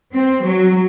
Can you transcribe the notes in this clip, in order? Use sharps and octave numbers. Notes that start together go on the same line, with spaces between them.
C4
F#3